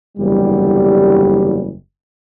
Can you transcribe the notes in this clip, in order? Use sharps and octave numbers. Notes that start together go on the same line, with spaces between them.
F#1 E2 D3 G3